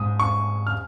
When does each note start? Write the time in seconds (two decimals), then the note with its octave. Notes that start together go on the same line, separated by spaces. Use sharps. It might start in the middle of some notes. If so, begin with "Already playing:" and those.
Already playing: G#2 D#6
0.20 C#6
0.67 F6